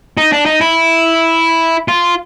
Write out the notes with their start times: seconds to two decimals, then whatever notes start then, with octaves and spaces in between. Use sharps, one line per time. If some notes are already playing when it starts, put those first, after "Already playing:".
0.17 D#4
0.33 D4
0.46 D#4
0.61 E4
1.88 F4